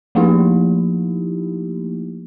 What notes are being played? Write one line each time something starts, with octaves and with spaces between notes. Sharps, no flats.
F3 A3 A#3 D#4 E4 G4